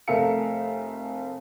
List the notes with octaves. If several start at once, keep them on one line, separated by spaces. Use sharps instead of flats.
F1 A3 A#4 E5 F5 C#7